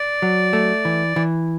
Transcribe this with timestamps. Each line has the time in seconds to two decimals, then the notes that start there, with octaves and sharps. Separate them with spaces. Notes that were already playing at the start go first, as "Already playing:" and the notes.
Already playing: D5
0.22 F#3
0.53 A3
0.85 E3
1.16 E3